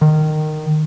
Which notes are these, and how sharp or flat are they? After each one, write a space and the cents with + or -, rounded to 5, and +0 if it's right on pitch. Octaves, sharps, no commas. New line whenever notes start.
D#3 -15